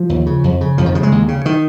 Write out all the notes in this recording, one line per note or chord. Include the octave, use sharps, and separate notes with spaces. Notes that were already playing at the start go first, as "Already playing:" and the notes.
Already playing: F3
D#2
C#3
F2
C#3
F2 F3
D#3
C#3 F3
G#3
D#2
C#3
D#3